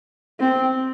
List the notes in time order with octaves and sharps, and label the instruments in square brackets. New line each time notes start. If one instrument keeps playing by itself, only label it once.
[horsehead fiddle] C4